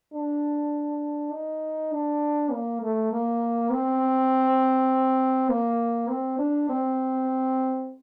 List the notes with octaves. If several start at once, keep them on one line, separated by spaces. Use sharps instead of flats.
D4
D#4
D4
A#3
A3
A#3
C4
A#3
C4
D4
C4